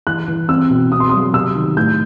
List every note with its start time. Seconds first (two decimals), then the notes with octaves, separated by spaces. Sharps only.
0.07 E3 F#6
0.28 E3
0.49 C4 E6
0.70 B2
0.91 C4 D#6
1.00 C6
1.10 F#3 D#6
1.34 C3 E6
1.55 D#3
1.76 A2 G6